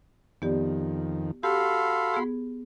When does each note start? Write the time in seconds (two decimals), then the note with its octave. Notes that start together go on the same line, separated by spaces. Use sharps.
0.42 F2 D#3 B3 G4 D5
1.43 F#4 G4 A4 F5 B5 C6
2.14 B3 G#4